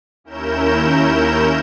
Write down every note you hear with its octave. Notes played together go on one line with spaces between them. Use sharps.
D#2 C#4 E4 A#4 G6 E7